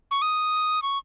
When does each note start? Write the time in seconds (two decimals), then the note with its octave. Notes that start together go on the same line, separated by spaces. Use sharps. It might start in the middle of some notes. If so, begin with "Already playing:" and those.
0.11 C#6
0.22 D#6
0.82 C#6